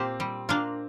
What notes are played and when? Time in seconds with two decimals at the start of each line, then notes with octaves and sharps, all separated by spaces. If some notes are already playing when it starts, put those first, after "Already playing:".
Already playing: A#2 A#3 C4 G4 C5
0.20 G3
0.49 A#3 D4 F4 A#4